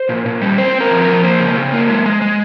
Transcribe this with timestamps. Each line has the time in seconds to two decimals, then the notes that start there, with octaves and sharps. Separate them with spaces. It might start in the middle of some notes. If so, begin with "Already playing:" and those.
Already playing: C5
0.09 A#2
0.26 A#2
0.41 G3
0.58 C4 C5
0.75 C4
0.80 A#4
0.91 F3
1.02 A#4
1.07 F3
1.24 A#3 C5
1.40 C#3
1.57 C#3
1.73 A#3
1.89 G#3
2.06 G#3
2.21 G#3